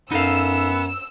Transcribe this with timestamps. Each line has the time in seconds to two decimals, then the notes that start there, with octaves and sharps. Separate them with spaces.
0.12 F#2 B3 D#4 A4 F5 E6